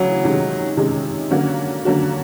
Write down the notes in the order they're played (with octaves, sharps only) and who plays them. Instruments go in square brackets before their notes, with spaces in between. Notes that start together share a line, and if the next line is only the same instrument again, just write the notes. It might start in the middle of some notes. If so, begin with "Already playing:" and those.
Already playing: [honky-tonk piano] D2 C#3 E3 [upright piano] F#3
[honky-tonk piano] C3 D#3 G#3 C#4
C3 D#3 G#3 C#4
D3 F#3 A#3 C#4 F#4
D3 F#3 A#3 C#4 F#4